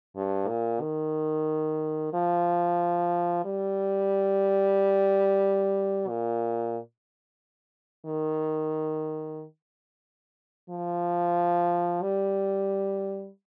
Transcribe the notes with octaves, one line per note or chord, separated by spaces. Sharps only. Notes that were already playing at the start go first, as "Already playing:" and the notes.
G2
A#2
D#3
F3
G3
A#2
D#3
F3
G3